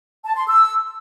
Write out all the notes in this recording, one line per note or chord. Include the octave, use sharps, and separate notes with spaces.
A5
C6
E6